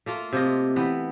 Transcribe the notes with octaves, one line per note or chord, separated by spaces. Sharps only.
A3 A#3 F4
C3 F4 D#5
E3 B3 G5